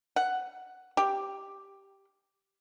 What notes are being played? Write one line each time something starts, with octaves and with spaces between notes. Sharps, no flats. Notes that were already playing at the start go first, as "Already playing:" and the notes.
F#5
G4